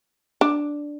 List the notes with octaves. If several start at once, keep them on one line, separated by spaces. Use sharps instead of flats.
D4